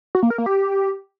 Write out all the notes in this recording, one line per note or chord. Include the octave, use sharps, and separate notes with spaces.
F#4
A#3
A#4
A#3
G4